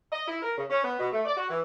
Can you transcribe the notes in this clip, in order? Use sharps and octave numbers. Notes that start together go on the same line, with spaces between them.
D#5
E4
A#4
C#3
C#4
B3
B2
A3
D5
F#4
E3